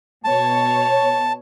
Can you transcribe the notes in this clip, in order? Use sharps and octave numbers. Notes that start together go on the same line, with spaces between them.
B2 C#5 A5